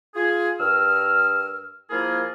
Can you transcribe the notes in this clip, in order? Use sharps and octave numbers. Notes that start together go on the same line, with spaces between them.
F4 G#4
G2 A#4 E6 F6
F3 A#3 E4 F4 G#4 A#4